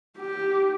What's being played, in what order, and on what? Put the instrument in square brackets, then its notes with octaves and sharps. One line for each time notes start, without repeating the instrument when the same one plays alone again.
[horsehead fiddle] G4